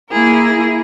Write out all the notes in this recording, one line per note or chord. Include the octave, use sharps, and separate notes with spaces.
A#3 E4 G#4 A#4